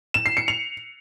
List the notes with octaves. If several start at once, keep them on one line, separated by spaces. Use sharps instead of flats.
E7
C7
C#7
F7